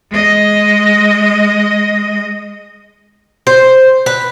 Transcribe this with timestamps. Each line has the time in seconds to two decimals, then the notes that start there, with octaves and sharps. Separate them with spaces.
0.11 G#3 D#5
3.47 C5
4.06 B4